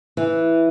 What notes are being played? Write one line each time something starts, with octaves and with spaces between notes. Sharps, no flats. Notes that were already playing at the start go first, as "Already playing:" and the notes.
E3